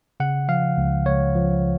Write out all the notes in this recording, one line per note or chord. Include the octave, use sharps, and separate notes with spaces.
C#3 F#5
F3 F5
C#2
C#2 C#5
F3